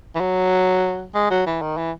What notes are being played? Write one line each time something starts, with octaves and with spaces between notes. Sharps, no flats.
E3
F#3
G#3
F#3
E3
D#3
E3